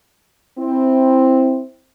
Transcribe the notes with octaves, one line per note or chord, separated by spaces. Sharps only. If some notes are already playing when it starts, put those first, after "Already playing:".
C4 E4